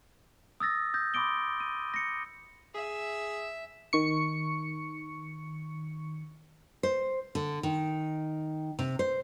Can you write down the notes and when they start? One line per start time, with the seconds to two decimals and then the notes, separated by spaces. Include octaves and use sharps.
0.60 D#6 E6 A6 A#6
0.94 D#6 G6 A#6
1.14 B5 C6 D6 D#6 D7 G7
1.60 D#7
1.94 A#6 C#7
2.75 G#4 E5
3.93 D#3 C#6 C#7
6.83 C5
7.35 D3
7.63 D#3
8.79 C3
8.99 C5